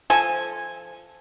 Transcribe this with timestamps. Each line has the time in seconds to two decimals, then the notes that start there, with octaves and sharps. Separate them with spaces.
0.10 F3 A4 C5 G#5